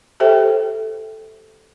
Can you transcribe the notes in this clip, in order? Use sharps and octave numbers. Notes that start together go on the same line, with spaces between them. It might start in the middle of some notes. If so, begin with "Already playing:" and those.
G4 A4 C5 E5 G5